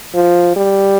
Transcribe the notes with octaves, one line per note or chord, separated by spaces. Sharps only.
F3
G3